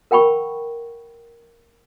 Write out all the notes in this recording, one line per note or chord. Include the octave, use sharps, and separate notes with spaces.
A#4 F#5 G5 B5 C#6